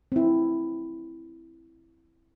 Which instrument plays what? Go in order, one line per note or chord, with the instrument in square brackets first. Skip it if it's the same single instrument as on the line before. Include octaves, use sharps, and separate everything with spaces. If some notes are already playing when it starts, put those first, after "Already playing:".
[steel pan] C4 E4